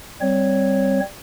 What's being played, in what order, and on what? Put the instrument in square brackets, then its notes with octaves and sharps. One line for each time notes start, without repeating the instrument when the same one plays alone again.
[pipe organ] G3 C4 C#5